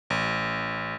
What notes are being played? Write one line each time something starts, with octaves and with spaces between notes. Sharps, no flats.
A1